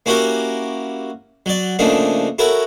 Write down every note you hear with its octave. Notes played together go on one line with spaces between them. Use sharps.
A#3 C#4 E4 F#4 G4 A#4
F#3 D5
C#3 F3 A3 A#3 D4 D#4
E4 F#4 A4 A#4 C#5